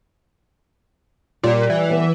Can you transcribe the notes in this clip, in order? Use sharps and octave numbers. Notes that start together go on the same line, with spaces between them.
A#2 G3
E3
G3 B3